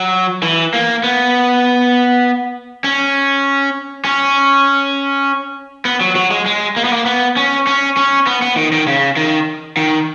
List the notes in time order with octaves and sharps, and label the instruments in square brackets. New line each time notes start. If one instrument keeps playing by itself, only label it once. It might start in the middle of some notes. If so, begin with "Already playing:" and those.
Already playing: [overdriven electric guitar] F#3
E3
A#3
B3
C#4
C#4
B3
F#3
F#3
G#3
G#3
A#3
B3
A#3
B3
C#4
C#4
C#4
B3
B3
D#3
D#3
C#3
D#3
D#3